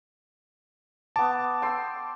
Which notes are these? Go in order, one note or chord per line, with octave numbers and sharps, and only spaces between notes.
B3 A5 D6
G5 C6 E6